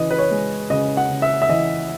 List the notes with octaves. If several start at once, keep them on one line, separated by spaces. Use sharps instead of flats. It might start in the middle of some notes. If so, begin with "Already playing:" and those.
Already playing: C#3 E3 B4 D#5
B4
C#5
G#3
C#3 D#5
F#5
C#3
E5
E5
E3 D#5